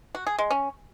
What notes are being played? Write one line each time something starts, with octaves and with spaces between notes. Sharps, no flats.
F#4
G#4
G#3
C#4